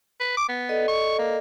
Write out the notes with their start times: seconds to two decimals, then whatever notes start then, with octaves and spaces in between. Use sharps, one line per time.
0.20 B4
0.37 D6
0.49 B3
0.69 A4 D5 D#5
0.88 C#6
1.19 A#3